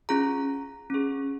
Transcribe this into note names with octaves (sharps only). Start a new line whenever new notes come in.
C#4 F4 G#4 A#5
C#4 G#4